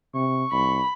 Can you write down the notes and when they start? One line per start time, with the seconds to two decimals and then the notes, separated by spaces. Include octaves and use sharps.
0.14 C3 C#6
0.52 C2 B5